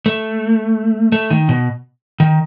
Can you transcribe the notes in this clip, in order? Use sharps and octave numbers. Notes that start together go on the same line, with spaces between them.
A3
A3
D#3
B2
D#3